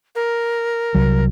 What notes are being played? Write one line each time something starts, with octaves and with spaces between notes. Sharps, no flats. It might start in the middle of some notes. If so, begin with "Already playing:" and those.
A#4
C2 F#3